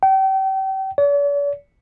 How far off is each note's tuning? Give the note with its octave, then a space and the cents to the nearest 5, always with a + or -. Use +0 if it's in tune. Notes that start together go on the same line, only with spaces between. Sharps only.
G5 -35
D5 -45